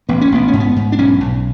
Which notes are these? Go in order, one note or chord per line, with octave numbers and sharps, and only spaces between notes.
A1 B3
C#4
A1 B3
C#4
G#2
B3
G#2
D4
B1 C#4
B1